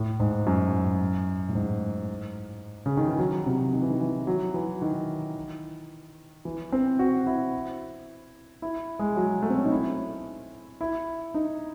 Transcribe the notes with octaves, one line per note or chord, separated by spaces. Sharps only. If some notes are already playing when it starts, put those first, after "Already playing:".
Already playing: A2
G#2
F#2
A2
G#2
C#3
D#3
E3
F#3
C3
D#3
E3
D#3
E3
F#3
E3
D#3
E3
C4
F#4
E4
E4
G#3
F#3
A3
C4
C#4
D#4
E4
E4
D#4